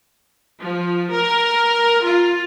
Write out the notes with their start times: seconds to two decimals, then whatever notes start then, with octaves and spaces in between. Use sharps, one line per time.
0.61 F3
1.11 A#4
2.04 F4